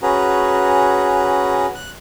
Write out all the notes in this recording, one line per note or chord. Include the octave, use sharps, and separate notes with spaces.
C#4 F#4 G#4 B4 A#5
F#6